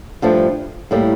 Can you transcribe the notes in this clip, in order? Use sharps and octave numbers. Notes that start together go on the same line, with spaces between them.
G2 F3 A3 D4
A2 G3 A#3